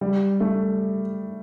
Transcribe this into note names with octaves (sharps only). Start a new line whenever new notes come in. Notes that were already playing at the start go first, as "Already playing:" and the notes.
G3
A3